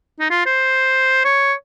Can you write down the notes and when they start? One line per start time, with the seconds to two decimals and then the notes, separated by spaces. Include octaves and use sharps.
0.20 D#4
0.30 F4
0.46 C5
1.25 C#5